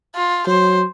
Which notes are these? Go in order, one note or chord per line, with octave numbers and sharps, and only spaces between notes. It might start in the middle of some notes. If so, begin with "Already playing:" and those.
F4
F#3 C5